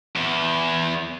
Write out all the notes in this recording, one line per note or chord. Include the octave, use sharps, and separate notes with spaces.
E2